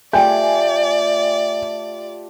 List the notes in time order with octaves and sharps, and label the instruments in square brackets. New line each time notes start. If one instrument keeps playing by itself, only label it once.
[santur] A3 F4 G4 [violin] D5 [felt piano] G5 G#5